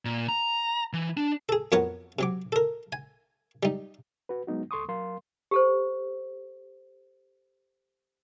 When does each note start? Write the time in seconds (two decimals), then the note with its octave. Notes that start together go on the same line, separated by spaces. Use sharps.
0.05 A#2
0.29 A#5
0.93 E3
1.17 D4
1.49 G#4 A4
1.72 F2 B3 F#4 A#4 C#5 F#5
2.19 C3 F#3 D6
2.52 A4 A#4
2.92 G#5
3.63 G3 D#4
4.29 F#4 B4
4.47 F#3 G#3 B3 D#4 F#4
4.71 C#2 A4 C6 C#6 D#6
4.88 F#3 A#4 F5 C6
5.51 G4 A4 C5